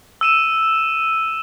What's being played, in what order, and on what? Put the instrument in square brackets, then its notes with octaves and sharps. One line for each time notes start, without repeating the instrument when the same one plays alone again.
[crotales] E6 D#7 E7